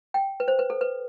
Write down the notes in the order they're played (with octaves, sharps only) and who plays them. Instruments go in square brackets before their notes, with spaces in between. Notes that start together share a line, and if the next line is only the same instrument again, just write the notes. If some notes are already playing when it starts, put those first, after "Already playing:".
[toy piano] G5
B4
C5
B4
A4
B4